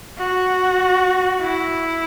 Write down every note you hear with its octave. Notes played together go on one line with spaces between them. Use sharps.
F#4
E4